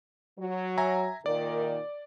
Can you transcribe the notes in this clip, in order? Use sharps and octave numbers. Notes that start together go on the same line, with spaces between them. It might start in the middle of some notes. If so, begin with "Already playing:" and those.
F#3
E5 G#5 A#5
A#2 D#3 D5